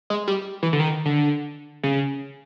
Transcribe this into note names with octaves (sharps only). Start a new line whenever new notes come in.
G#3
G3
E3
D3
D#3
D3
C#3